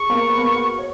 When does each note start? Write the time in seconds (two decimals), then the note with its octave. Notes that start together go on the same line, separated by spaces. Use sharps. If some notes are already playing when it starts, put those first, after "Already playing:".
Already playing: G#4 C#6
0.09 A#3 A#4
0.28 B3 B4
0.38 A#3 A#4
0.47 G#4
0.56 F#4
0.79 C#5